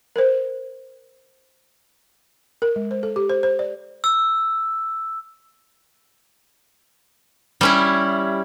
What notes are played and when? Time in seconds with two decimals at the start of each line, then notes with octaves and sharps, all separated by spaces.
0.16 A#4 C5
2.62 A#4
2.76 G#3
2.91 C5
3.03 A4
3.16 G4
3.29 C5
3.43 C5
3.59 D5
4.04 E6
7.61 G3 C#4 E4